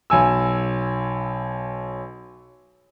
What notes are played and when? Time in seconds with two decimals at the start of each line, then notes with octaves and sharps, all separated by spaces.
0.10 B1 G#5 E6